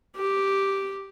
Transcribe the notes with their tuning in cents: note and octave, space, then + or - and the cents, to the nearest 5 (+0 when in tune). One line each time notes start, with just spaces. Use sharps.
G4 -5